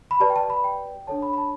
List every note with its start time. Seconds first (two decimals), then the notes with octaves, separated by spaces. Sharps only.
0.11 B5
0.20 G4 B4 D5 A5
0.30 G5
0.36 A5
0.50 B5
0.64 G5
1.07 D4 A4 C#5 A5
1.22 B5
1.33 B5
1.37 A5